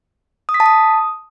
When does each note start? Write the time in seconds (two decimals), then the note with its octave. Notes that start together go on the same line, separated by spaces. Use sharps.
0.49 D#6
0.54 B6
0.60 A5
0.66 D#6